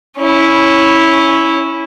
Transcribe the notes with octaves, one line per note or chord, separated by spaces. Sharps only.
C#4 E4